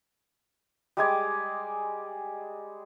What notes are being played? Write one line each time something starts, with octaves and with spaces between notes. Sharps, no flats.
G3 G#3 G#5 D6